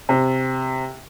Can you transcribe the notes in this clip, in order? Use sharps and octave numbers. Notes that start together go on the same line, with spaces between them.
C3